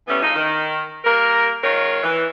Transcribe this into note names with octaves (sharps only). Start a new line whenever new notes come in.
E3 G3 A3 B3 C#4
A2 C#3 F3 D#4
D#3
G3 A#3 A#4
D#3 G#3 F4 A#4 C#5
E3